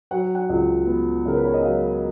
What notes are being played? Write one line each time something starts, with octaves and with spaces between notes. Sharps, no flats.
F#3 F#5
F#5
C#2
B3
C#3 A#4
B4
C#5
D#5
F#3 F5